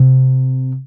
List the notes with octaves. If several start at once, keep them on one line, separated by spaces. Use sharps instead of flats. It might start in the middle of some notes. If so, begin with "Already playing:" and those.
Already playing: C3